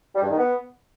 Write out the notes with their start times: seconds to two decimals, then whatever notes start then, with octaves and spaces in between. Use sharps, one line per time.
0.16 G3
0.23 G2
0.30 D#3
0.37 B3